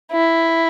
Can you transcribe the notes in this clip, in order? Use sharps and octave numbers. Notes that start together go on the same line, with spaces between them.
E4